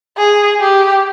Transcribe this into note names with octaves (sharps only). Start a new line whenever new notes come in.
G#4
G4